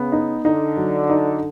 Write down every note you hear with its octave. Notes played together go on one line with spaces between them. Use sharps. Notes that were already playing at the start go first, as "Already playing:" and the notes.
Already playing: C#3 B3
D#4
D3 D#4
F#3
D#4